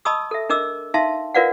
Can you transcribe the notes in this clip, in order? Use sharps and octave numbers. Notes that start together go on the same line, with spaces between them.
D#5 A5 B5 C#6 D#6 E6
A4 E5
D4 A#4 D#5 D6 E6
D#4 E5 F5 A5 C6
F4 A#4 B4 D5 F5 F#5